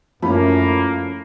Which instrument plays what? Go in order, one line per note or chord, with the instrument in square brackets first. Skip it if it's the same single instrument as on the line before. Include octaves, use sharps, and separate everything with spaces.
[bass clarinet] F#2 [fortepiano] F3 C#4 [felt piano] A3 E4 B5 [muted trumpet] A#3